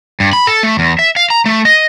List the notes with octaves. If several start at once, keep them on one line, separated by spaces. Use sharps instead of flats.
G2
B5
A4
A3
E2
E5
F5
A#5
A3
D#5